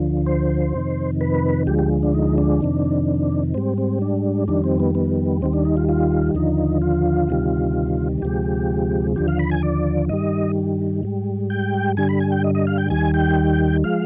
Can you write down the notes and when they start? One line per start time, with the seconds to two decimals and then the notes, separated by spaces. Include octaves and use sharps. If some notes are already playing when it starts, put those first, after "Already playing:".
Already playing: D2 D3 F3
0.26 C5
0.74 F2 C3 D#3
1.21 B4
1.67 D2 D3 F3 G#3 G4
1.79 G4
2.03 D4
2.14 D#4
2.38 D4
2.61 F2 C3 D#3
3.54 G#2 G3 C4
3.78 C4
4.02 D4
4.48 F2 D#3 G3 D4
4.64 C4
4.80 B3
4.95 B3
5.42 D#2 D#3 G3 C4
5.53 D4
5.65 D#4
5.77 F4
5.89 F4
6.35 D#2 D3 F3 D#4
6.82 F4
7.29 D2 C3 D#3 G3
8.22 D2 C3 F3 G#3 G4
9.16 D#2 D3 F3 G4
9.28 F5
9.39 B5
9.51 G#5
9.63 D5
10.09 G2 D#3 G3 D#5
11.03 G#2 G3
11.50 G5
11.97 G2 D3 G3 G#5
12.09 B5
12.20 G#5
12.32 G5
12.44 D#5
12.55 D#5
12.67 F5
12.78 G5
12.90 D#2 D#3 G3 G#5
13.14 G5
13.84 F3 G#3 F5